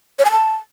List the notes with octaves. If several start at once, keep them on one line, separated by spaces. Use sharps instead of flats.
C#5
G#5
A5